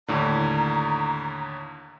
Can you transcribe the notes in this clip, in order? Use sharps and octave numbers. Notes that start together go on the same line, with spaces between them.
D#2 A2 D3 A#5